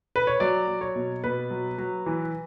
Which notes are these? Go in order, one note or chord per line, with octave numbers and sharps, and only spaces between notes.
B4
C#5
F#3 D5
F#3
C#5
B2
B2 B4
F#3
F#3
E3